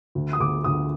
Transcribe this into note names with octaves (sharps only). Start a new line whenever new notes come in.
D2
D#6
D2 D6
D2 D#6